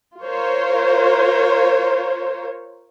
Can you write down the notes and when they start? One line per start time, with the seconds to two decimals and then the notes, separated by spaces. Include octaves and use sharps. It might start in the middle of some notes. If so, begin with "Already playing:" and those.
0.23 F4 A#4 C5 C#5